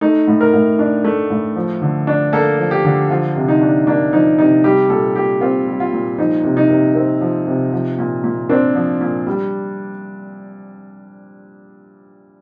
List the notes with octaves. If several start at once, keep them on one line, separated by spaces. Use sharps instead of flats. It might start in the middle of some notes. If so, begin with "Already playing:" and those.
A3 D#4
A2
A#4
A2
D4
A3
A2
F3
D3
D4
A#3 A4
F3
G4
D3
F3 F4
C3
D#4
D4
A#3 D4
F3 D#4
C3 D#4
G3 G4
A#2 A4
A#2 G4
C4 F4
G3
F4
A#2
F3 D#4
C3
D#4
C3
C4
F3
C3
F3
A#2
A#2
C4 D4
F3
A#2
G3